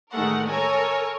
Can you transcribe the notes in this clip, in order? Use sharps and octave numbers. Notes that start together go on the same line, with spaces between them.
A1 D#3 G#3 A3 A#4 F#5
A4 A#4 C#5 G#5